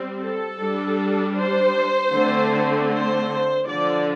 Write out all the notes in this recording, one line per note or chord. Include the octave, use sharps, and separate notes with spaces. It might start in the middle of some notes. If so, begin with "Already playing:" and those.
Already playing: G3 C4
A4
G3 D4
C5
D3 A3 C4
C5
D3 F3 D4 D5